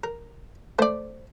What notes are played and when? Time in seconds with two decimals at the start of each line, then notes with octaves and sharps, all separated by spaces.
0.04 A#4
0.79 A3 C5 D5